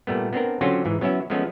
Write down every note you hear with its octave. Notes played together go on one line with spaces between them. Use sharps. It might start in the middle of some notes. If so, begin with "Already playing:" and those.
A#2 G3 A3 B3
B3 C4 D4 A#4
D3 F#3 C4 C#4 F4 F#4
G#2 E3
F#3 B3 C#4 E4 E5
F3 G#3 A3 B3 C#4